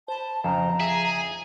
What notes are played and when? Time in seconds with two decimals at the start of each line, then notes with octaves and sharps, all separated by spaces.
0.08 C5 A5 B5
0.44 F2 C#3 F3 A#5
0.80 G#4 E5